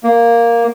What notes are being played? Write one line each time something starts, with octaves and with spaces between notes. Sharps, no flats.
A#3